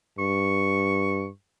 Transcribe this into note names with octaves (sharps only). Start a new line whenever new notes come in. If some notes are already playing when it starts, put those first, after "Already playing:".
G2 C#6